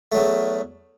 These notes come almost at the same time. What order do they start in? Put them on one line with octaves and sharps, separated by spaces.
A3 F#3 E2